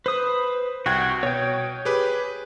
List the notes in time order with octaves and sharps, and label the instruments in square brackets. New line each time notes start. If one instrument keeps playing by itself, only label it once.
[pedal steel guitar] B4 D#6 [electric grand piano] C5
[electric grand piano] C2 G5 G#6 [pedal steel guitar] F#4
[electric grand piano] B2 [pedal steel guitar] C#5 G5
[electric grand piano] G4 G#4 B4